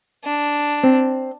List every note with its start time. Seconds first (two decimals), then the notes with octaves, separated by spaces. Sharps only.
0.24 D4
0.84 C4